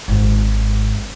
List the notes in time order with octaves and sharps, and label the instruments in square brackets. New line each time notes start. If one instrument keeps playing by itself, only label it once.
[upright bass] G#1 G#2